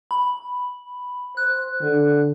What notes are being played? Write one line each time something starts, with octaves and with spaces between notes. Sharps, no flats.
B5
C5 F#6
D3